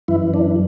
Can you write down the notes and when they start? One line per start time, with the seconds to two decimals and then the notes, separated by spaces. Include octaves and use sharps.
0.08 F#2 E3 E4
0.34 D4